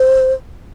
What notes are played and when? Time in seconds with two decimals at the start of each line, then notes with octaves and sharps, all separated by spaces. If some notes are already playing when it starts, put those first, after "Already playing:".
Already playing: C5